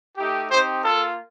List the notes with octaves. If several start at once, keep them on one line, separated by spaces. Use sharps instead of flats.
A3 D#4 G4
C4 D#4 G4 C5
A#3 F4 A4